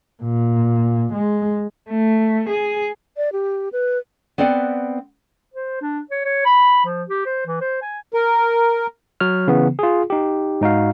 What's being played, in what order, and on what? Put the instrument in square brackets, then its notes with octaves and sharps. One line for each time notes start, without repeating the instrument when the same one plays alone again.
[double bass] A#2
G#3
[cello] A3
G#4
[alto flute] D5
G4
B4
[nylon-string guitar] B3 C4 B4 D5 F#5
[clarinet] C5
D4
C#5
C#5
B5
F3
G4
C5
E3
C5
G#5
[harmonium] A#4
[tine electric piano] F#3 C#5 F6
C#3 E3 B3
F4 G#4
D#4 G4
G#2 D#4 F#4 F5